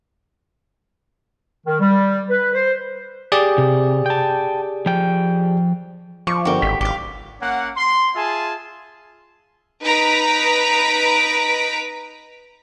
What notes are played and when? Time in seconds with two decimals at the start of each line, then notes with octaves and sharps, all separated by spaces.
1.65 D#3
1.80 G3
2.29 B4
2.54 C5
3.32 G4 G#4 D5
3.58 C3
4.06 G5 A5
4.86 F3 G5
6.27 F3 C#6 D6
6.45 G1 F#4 G4 A#4 C#6
6.62 G#1 B6
6.81 G#1 G4 F5
7.41 A#3 C#4 F#5
7.76 C6
8.15 F4 G#4 E5 G#5 A5
9.84 D#4 B4 A#5 B6 D7